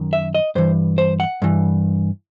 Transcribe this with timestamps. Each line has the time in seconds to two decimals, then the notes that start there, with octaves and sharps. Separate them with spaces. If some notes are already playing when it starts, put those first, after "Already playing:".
Already playing: F#2 D#3
0.13 E5
0.35 D#5
0.55 G2 E3 C5
0.98 C5
1.20 F#5
1.42 G2 E3